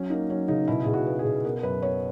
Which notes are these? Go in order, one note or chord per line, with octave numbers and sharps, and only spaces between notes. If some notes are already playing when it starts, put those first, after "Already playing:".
Already playing: F#3 C#4
A#3 D#4
F#3 C#4
C#3 D#4
B2 E4
B2 G#4
F#4
B3
G#4
B2
B3 A#4
F#2 B4
B3 C#5